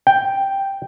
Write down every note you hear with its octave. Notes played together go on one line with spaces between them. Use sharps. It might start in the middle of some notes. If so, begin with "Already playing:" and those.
G5